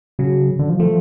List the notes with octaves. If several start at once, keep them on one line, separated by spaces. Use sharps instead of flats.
C#3 F#3
D3
F3
F3 A3